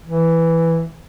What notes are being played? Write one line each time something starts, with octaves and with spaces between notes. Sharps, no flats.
E3